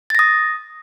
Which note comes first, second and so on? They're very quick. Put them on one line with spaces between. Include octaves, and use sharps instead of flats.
A6 A#6 D#6